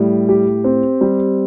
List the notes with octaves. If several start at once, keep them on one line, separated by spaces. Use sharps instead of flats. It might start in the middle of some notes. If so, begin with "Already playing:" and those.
Already playing: A2 G3
G4
C4
G3